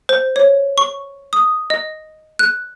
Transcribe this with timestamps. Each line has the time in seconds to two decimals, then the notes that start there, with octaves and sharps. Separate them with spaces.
0.09 C5
0.36 C#5
0.78 C#6
1.33 D#6
1.70 D#5
2.39 F#6